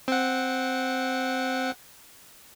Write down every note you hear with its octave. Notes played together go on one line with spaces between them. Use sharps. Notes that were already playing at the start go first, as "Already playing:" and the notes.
C4 F#5